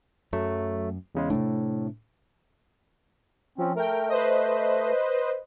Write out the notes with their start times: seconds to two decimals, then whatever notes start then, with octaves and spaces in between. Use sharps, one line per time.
0.33 F#2 F#3 A3
1.15 E2 C#3 G#3
1.30 A2 C3 A3 D4
3.58 F3 C4 C#4
3.76 A3 A#4 G5
4.09 B4 C5 D#5